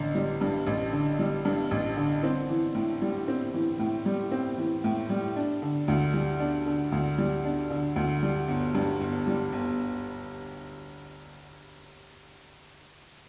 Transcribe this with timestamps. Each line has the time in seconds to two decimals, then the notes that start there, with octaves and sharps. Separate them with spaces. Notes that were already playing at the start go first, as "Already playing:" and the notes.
Already playing: A1 D3
0.15 G3
0.41 G2
0.67 A1
0.92 D3
1.19 G3
1.45 G2
1.71 A1
1.97 D3
2.23 C4
2.49 E3
2.75 A2
3.02 G3
3.28 C4
3.54 E3
3.79 A2
4.06 G3
4.32 C4
4.58 E3
4.84 A2
5.10 G3
5.36 D4
5.62 D3
5.88 D2
6.14 G3
6.40 D4
6.66 D3
6.92 D2
7.18 G3
7.45 D4
7.70 D3
7.96 D2
8.22 G3
8.48 G1
8.75 G2
9.01 G1
9.27 G3
9.52 G1